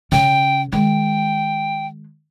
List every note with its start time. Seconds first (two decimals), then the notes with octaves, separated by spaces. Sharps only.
0.12 C#3 C#4 G5
0.72 D#3 G#3 G5